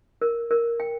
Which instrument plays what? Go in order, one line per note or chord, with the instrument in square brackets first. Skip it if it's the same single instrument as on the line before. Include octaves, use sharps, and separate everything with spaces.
[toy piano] A#4
A#4
G5